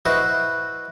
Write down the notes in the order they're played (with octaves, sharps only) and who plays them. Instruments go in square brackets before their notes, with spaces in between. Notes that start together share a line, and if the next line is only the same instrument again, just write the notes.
[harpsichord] E4 F#4 B4 C5 D#5